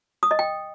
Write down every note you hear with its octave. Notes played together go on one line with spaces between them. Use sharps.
D#6
D#5
G5